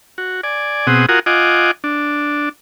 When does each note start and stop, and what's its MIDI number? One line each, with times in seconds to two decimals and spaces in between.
0.18 0.41 66
0.43 0.87 74
0.43 0.87 80
0.87 1.06 47
0.87 1.06 60
0.87 1.06 68
0.87 1.06 78
0.87 1.06 87
1.09 1.19 65
1.09 1.19 66
1.09 1.19 70
1.09 1.19 78
1.09 1.19 80
1.09 1.19 87
1.26 1.71 65
1.26 1.71 75
1.26 1.71 78
1.26 1.71 80
1.26 1.71 86
1.84 2.49 62